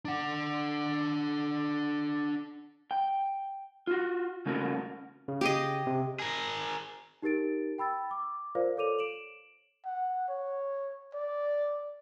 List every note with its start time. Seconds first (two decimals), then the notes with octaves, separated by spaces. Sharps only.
0.05 D4 F#5
2.91 G5
3.87 F4 F#4
4.46 C#3 A3 A#3 C#4 F#4
5.28 C#3
5.41 G4 G#4 D#5
5.87 C3
6.20 G#4 A#4
7.22 D#4 G4 A#4 A6 D7
7.78 G5 B5 E6 A6
8.11 D6
8.55 F4 A#4 C5 D5 F5
8.77 A4 C#5 D6 D#7 F7
8.99 D7 E7 F#7
9.85 F#5
10.28 C#5
11.14 D5